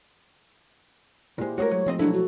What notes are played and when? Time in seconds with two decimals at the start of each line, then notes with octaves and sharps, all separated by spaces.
1.38 A#2 G#3 E4 G4 C5
1.58 G#3 A3 F#4 G#4 A#4 C#5
1.71 F#3
1.86 G#2 F3 C4 D#5
1.99 B1 F#3 D4 E4 A4
2.13 F#4